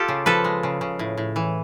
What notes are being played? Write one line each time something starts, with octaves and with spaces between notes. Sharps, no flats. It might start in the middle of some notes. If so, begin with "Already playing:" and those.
Already playing: F4 G4 A4
C#3
F3 A4 B4
G#3
C#3
C#3
A2
A2
E3